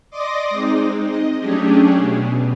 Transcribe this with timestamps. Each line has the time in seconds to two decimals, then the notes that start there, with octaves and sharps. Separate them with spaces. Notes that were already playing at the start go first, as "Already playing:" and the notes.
0.11 D5 D#5 C6 D6 D#6 A#6
0.50 G#3 C4 D#4
1.05 D#5
1.38 F#3 A3 C#4 D4 G4 G#4
1.97 B2